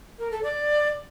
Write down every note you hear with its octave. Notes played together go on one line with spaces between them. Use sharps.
A#4
A4
D5